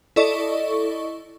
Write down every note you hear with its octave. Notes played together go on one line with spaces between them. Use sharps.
E4 A4 D5 D#5 C#6